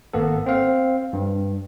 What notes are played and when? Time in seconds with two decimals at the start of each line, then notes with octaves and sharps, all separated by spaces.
0.14 G#1 A#3 B3 A4
0.46 C4 C5 F5
1.13 G2